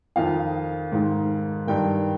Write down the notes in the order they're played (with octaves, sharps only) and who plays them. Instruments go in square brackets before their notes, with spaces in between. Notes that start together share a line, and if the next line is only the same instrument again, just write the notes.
[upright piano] F2 D#3 F5
G#2 D#3
G2 D#3 G5